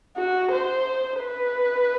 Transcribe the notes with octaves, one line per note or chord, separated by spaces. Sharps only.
F#4
C5
B4